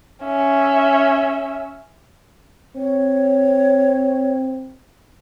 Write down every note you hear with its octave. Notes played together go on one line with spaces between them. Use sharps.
C#4 E5
C4 C#5